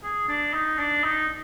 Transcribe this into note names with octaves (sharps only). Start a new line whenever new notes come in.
G#4
D4
D#4
D4
D#4